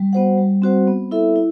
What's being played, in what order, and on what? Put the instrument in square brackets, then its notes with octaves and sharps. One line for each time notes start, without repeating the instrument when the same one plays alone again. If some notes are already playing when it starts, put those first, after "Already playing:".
Already playing: [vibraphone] G3
B3 F#4 C5 F#5
G3
C4 F#4 C5 F#5
B3
E4 A4 E5
E4